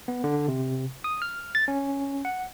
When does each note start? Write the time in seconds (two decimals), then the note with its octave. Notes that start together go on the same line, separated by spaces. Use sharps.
0.08 B3
0.24 D3
0.48 C3
1.04 D#6
1.22 F6
1.55 A6
1.68 C#4
2.25 F#5